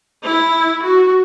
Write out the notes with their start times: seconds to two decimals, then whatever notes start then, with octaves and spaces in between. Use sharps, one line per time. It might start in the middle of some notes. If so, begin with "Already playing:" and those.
0.24 E4
0.83 F#4